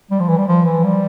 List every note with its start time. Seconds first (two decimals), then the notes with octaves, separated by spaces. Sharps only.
0.11 G3
0.20 F3
0.29 E3
0.38 G3
0.48 F3
0.65 E3
0.84 G3